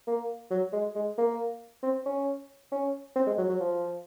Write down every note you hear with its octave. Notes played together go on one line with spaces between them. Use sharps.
A#3
F#3
G#3
G#3
A#3
C4
C#4
C#4
C4
G#3
F#3
F#3
F3